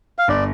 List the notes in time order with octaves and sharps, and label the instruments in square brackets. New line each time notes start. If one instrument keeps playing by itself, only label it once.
[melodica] F5
[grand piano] G1 [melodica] D5